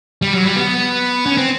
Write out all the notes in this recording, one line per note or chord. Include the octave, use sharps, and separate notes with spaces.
G3
F#3
G3
B3
C#4
C4